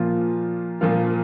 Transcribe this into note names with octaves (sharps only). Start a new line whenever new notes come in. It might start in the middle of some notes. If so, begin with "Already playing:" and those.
Already playing: A#2 F3 A#3 F4
A#2 F3 A#3 F4